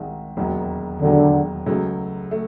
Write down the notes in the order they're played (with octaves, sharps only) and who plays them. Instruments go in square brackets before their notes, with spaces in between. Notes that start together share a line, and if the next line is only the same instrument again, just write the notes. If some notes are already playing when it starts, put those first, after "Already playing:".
Already playing: [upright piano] C2 C3 D#3 G#3
E1 D#2 D#3 F#3
[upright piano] E1 D#2 D#3 F#3 [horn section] D3
[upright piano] C#2 C#3 F#3 A3
A3